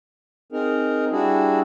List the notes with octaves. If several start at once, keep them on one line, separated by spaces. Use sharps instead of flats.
C4 D#4 G#4 A#4
G3 D4 E4 F#4 G#4